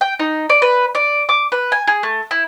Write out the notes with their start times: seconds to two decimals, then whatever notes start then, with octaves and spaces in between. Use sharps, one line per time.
0.01 G5
0.19 D#4
0.50 D5
0.62 B4
0.95 D5
1.29 D6
1.52 B4
1.72 G#5
1.87 G#4
2.03 A3
2.31 E4